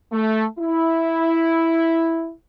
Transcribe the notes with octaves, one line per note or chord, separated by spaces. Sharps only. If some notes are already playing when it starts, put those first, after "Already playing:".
A3
E4